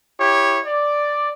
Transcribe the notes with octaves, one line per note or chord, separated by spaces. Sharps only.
E4 G4 C#5
D5